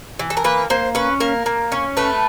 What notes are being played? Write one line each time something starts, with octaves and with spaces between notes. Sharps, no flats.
E3
A4
A#4
A#3 B4
A#3 C5
C#4 B4
A#3 A#4
A#3
C#4
A3 B4